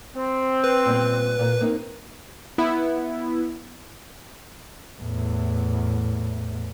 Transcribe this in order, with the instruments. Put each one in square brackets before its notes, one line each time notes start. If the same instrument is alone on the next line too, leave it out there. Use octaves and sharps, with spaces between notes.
[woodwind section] C4
[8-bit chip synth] B4
[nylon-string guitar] A#2 G3 B3
A#2 A#3
A#3 C4 D#4
[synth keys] B3 E4
[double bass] E2 A2